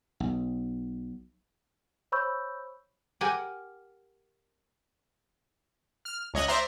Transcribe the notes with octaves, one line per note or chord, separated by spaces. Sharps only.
B1
C5 C#5 B5 C#6 E6 G6
G4 A#4 F#5 G#5
F6
C#2 C#5 D#5 F#6
C5 D5 E5 A#5 C6